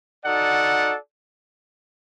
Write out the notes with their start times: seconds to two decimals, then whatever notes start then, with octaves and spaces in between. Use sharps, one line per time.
0.25 D#4 F#4 A4 D5 F#5